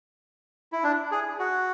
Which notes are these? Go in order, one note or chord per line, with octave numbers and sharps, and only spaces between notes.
E4
D4
G#4
F#4